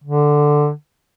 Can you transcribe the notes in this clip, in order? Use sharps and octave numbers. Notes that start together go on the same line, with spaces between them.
D3